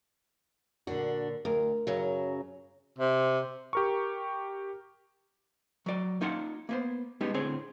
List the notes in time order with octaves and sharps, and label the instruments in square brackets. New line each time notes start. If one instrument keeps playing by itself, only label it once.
[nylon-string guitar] A#2 D3 [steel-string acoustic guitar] D4 F#4
[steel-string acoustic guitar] D2 [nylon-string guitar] A#4
[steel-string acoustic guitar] F#2 C#3 F#3
[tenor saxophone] C3
[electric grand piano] G4 A#4 C#6
[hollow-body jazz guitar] F#3 D5
A#3 D#4 F4 F5 F#5
A#3 B3 C5
G3 G#3 B3 C#4 D#4 G4
A2 D3 C4 G#4 C#5